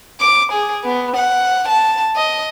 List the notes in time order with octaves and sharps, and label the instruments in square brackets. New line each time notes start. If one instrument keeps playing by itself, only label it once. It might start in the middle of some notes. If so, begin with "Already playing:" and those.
[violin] D6
G#4
B3
F#5
A5
D#5